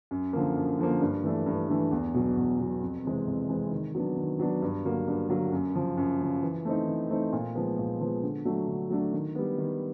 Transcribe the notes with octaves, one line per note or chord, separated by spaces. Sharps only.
F#2
D3 F3 A#3
F#2
D3 F3 A#3
G2
E3 A3 D4
G2
E3 A3 D4
E2
B2 F#3
E2
B2 F#3
F2
C3 E3 G#3 C4
F2
C3 E3 G#3 C4
D#3
F#3 B3 D4
D#3
F#3 B3 D4
G2
D3 F#3 A#3
G2
D3 F#3 A#3
F#2
C#3 F3
F#2
C#3 F3
E3
A3 C4 D#4
E3
A3 C4 D#4
A#2
F3 G#3 B3
A#2
F3 G#3 B3
D3
F#3 A3 D4
D3
F#3 A3 D4
D#3
G3 B3
D#3